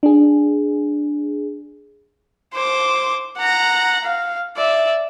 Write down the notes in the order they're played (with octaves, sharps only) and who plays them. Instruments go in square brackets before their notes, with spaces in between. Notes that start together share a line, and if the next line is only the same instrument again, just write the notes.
[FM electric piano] D4 G#4
[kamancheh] C5 D6
F#5 A#5
F5
D5 E5